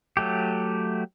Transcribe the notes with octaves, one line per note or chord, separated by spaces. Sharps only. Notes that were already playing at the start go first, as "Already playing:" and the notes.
F#3 A3 G4